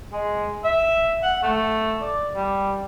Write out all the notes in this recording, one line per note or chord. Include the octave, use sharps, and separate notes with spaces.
G#3
E5
F#5
A3
D5
G3